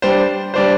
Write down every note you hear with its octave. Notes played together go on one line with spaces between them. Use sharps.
G3 D4 C5
G3 D4 C5